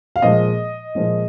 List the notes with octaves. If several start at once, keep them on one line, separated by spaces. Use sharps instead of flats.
F5
A#2 F3 G#3 D#5
A#2 F3 G#3